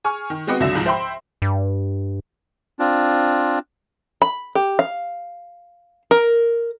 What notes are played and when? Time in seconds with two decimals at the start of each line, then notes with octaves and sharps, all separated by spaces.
0.04 G#4 G#5 C#6 F6
0.30 D#3
0.47 G#3 B3 C4 F#4 D#5
0.60 C#2 D3 F#3 E5 A#6 E7
0.74 C2 G#2 F3
0.86 C5 E5 G5 B5 C6
1.42 G2
2.79 C4 D4 F4
4.22 B5
4.55 G4
4.79 F5
6.11 A#4